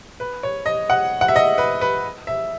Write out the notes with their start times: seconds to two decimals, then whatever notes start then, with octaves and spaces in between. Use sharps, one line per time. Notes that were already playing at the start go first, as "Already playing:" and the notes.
0.20 B4
0.43 C#5
0.66 D#5
0.90 F#5
1.21 F#5
1.28 E5
1.36 D#5
1.58 B4
1.81 B4
2.27 E5